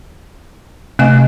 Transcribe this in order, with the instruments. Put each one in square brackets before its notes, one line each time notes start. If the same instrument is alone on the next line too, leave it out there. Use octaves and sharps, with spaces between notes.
[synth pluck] C3 [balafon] A3 D#5 G#5